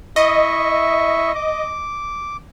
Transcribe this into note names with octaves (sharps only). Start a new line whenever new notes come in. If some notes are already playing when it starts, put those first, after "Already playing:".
E4 D#5 E5 C#6
D6